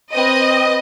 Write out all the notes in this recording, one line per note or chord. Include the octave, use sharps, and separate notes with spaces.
C4 B4 D#5